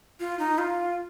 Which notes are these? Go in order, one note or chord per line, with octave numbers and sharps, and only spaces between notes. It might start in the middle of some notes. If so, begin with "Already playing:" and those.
F4
D#4
F4